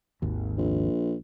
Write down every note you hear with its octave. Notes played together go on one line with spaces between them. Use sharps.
G#1 D#2
A#1